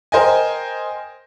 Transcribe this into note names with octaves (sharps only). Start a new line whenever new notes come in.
A#4 C5 D#5 G5 G#5